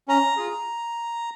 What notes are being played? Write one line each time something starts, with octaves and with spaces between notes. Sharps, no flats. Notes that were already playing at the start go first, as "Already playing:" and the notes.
C#4 A#5
F4 G#4